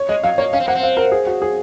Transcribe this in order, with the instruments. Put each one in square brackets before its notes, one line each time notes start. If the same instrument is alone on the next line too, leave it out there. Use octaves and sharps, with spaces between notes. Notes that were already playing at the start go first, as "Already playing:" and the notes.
Already playing: [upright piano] C#5
[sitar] G#3 [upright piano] D#5
[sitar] F#3 [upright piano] F5
[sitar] A#3 [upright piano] C#5
[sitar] C#4 [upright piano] F5
[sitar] C4
[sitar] A#3 [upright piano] F#5
[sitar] C4
[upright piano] F5
A#4
G#4
F#4
G#4